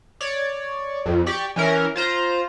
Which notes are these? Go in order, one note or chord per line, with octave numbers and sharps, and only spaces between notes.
C#5 D5
F2
G4 D5 C#6
E3 C#4 A#4
F4 C5 A#5